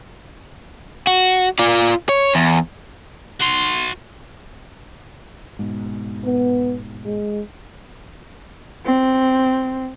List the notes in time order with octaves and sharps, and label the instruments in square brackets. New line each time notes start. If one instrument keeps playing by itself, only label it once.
[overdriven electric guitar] F#4
F4 D5
C#5
E2
[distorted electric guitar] F#4 C6
[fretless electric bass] G#2 B2
[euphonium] B3
G#3
[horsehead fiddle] C4